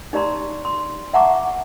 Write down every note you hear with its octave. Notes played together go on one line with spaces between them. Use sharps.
D#4 G4 D5 A#5 C6
C6
E5 F#5 A5 A#5 C#6 D6